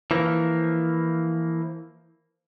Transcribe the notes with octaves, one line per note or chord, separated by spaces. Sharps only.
E3 F3 A#3